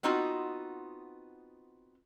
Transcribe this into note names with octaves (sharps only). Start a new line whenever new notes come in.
B3 C4 D#4 F4 F#4